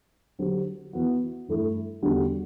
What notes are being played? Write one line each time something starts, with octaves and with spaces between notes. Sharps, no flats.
D3 F#3 C4 G4
E3 B3 F#4
G2 E3 A3 E4
E2 D3 G3 D4 F#4